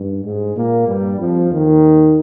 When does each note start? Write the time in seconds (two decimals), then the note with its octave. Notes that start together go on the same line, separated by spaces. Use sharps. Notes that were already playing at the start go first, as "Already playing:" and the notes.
Already playing: G2
0.24 G#2 G#3
0.55 A#2 A#3
0.87 G2 G3
1.19 F2 F3
1.50 D#2 D#3